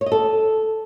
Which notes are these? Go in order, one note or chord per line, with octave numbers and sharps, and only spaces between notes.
C#5
D#5
A4